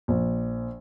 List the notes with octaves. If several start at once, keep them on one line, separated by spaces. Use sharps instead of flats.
A#1